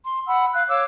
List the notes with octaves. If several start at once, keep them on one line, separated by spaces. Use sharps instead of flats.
C6
F#5 B5 E6
F5 F#6
C#5 F5 D6 E6